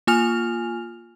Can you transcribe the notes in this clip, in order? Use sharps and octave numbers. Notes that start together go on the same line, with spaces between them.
A#3 F4 G#5 F6 F7